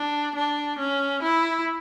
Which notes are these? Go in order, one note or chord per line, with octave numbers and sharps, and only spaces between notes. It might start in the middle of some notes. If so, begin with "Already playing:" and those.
Already playing: D4
D4
C#4
E4